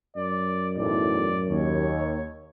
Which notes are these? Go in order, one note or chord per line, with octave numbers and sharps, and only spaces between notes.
F#2 D5
B1 E2 A2 D5
D#2 C#5